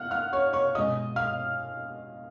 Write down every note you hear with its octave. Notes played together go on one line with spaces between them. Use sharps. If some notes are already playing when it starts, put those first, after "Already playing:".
Already playing: F5 F#5 F6 F#6
F5 F6
C#5 C#6
C#5 C#6
B2 G#3 D#5 D#6
F5 F6